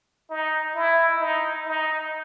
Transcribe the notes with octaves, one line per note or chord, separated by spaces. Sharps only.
D#4
E4
D#4
D#4